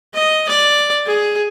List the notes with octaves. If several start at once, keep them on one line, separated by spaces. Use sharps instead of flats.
D#5
D5
G#4